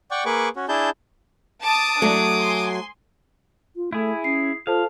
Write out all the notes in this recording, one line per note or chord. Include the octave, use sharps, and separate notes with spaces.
D5 F#5 G5 C#6
A#3 G#4 B4 C#6 D6
C#4 F#4
D4 E4 G#4 A5 G6
A5 D6 D#6
F#3 A3 D4
G#5 C6
F4
A3 E4 G#4
C#4 C7
F4 A4 C5 F5 A5